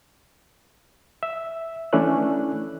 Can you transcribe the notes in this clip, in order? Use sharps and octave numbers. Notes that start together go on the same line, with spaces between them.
E5
E3 A3 C#4 D4 E4 F#6